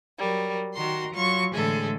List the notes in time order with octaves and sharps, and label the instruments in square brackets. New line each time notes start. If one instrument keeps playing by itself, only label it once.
[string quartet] F#3 G3 A#4
D#3 F#4 A#5 C6
F#3 F4 C#6
A2 D3 E3 G#3 G#4 A4